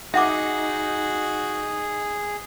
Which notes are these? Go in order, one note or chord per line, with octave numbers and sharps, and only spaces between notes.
D#4 F#4 G#4 E5 F#5 D6